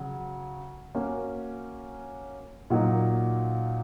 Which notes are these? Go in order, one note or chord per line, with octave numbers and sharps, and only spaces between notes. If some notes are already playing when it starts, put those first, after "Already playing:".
Already playing: C#3 F#3
A#3 C#4 F#4
A#2 F#3 A#3 D#4